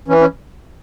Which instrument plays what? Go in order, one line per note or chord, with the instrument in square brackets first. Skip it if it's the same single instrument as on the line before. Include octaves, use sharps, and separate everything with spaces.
[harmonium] E3 C#4
C#4